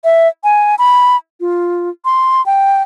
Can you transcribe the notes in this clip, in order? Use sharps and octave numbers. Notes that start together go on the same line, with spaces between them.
E5
G#5
B5
F4
C6
G5